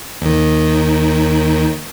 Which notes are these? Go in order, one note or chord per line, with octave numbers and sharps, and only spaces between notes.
D#2 D#3